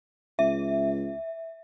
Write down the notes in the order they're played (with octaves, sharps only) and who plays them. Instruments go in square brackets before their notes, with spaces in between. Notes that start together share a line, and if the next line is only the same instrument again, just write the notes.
[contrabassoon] C#2 [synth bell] E5